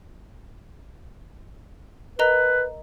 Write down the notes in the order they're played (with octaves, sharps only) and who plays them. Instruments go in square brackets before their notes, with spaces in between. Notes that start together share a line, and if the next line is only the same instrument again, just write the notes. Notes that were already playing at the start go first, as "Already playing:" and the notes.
[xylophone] A#4 D#5 A#5 [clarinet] B4